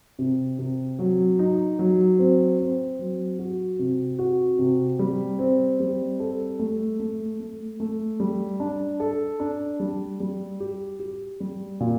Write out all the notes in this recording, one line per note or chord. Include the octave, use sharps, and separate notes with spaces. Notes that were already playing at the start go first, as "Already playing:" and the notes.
C3
C3
F#3
D#4
F#3
C4
C4
F#3
F#4
C3
F#4
C3
G3
C4
G3
A4
A3
A3
A3
A3
G3
D4
A4
D4
G3
G3
G4
G4
G3
A#2